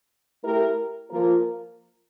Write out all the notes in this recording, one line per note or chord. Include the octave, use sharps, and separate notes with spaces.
A3 E4 G4 A#4
F3 A#3 F4 A#4